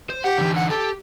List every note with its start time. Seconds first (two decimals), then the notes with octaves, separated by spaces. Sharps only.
0.10 C5
0.24 G4 F#5
0.38 D3 E3
0.55 F#5
0.70 G4 A4